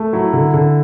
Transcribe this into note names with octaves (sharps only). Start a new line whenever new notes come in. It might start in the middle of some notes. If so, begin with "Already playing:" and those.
Already playing: A3
F#3 E4
D3
D3